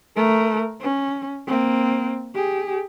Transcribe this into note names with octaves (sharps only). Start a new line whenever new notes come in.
A3 A#4
C#4
A#3 C4
G4 G#4